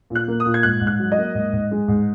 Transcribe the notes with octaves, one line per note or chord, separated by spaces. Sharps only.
A#2
F#6
A#3
D#6
A#2
G#6
G#2 F#6
G#2
F#6
F#3
D#5
A#3
G#2
G#2
G#3
G#2